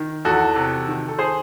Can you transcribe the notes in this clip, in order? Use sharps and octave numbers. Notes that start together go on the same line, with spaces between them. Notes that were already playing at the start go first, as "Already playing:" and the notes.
Already playing: D#3
E2 F#4 A4
C3
D#3
A4
G#4 C5